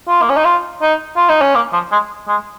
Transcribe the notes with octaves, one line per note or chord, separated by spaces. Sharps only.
F4
A#3
C#4
D#4
F4
D#4
F4
D#4
C#4
A#3
F3
G#3
G#3